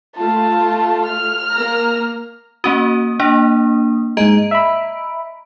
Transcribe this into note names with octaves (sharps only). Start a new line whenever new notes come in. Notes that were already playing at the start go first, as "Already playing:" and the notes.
A3 F4 A5
F6
A#3 A#5
A#3 C#4 F#4 D#6
A#3 D4
G#2 G#3 D#5 A#5 D7
E5 B5